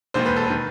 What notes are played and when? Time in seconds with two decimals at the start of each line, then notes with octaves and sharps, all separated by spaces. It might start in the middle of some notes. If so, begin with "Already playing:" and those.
0.14 E1 D#2 D#3 C5
0.26 B4
0.37 A4
0.47 D#3 B4